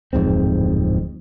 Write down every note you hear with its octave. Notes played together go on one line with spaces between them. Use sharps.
D1 F2 G#2 C4